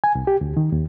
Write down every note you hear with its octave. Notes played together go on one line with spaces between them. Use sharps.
G#5
C2
G4
D2
D#3
D#2